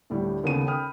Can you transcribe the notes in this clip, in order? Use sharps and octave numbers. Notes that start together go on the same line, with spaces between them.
D2 A2 G3
D#2 C#3 B3 C#4 A4 D#7
G5 B5 D#6 F6